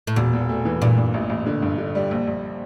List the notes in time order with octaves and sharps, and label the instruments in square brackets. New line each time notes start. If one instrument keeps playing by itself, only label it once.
[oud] A2
[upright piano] E1 [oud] A#2
[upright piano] E2
A3
E3
[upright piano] G2 [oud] A#2
[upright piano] G2
A1
A1
D3
G2
D3
G3
A#1
A#1